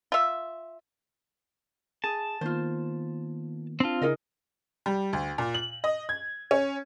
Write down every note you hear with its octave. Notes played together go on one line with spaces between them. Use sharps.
F4 E5
G#4 A5
D#3 A#3 B3 F4 C5
C4 D4 F4 A5
C#3 D4 E4 G#4 A#4 D#5
G3
D2
A#2
F#7
D#5
G#6
C#4